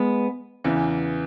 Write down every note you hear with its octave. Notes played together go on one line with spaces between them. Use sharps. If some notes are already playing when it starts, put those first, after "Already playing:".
Already playing: G#3 B3
E2 C#3 E3